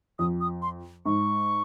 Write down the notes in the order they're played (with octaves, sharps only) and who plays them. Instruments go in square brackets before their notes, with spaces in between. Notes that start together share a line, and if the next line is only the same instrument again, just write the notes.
[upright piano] F2 [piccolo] D#6
[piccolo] D#6
C6
[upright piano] G#2 [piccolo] C#6